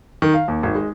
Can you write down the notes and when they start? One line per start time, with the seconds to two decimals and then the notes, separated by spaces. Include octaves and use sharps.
0.22 D#3
0.34 F5
0.48 D#2
0.63 G#1
0.75 G#3